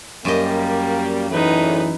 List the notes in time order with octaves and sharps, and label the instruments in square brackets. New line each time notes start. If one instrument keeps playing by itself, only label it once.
[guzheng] F#2 G4 D#5 [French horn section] G3 A#3
[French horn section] E2 A2 [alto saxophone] E3 [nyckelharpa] D#4 B4